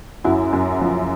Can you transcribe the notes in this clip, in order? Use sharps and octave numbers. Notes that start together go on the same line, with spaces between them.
F#2 E4 F#4
F#2
F3